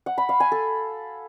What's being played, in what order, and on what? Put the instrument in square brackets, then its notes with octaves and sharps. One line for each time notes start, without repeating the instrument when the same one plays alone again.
[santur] F#5
B5
F5
G#5
A4